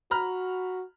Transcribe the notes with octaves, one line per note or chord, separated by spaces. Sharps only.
F#4 A#5 B5 F6